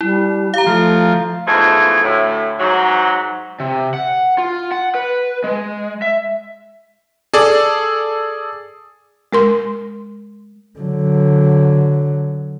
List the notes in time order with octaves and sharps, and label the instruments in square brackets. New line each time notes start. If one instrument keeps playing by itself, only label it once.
[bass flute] G3 [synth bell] E4
[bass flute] G4 [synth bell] F5 A#5
[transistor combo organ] F3 [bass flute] A3
[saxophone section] E2 G#2 F3 A3 G#4
D2 A2
G#2 F#3
[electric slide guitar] C3
F#5
F4
F#5
B4
G#3
E5
[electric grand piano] G#4 A4 D5
[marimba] G#3 A#4 C6
[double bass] D3 F#3